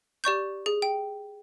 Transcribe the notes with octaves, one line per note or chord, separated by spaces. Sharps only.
G4 D5 C#6 G6
G#4
G5